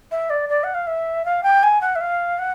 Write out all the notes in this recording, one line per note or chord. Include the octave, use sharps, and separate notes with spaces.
E5
D5
D5
F#5
F5
E5
F5
G5
G#5
F#5
E5
F5
F#5